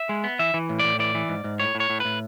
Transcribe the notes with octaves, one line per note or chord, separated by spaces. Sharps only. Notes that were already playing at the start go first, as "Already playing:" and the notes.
Already playing: E5
G#3
B3
E3 E5
E3
A2
A2 D5
E3 D5
E3
G#2
G#2
A2 C#5
A2
C#5
A2
A2 B4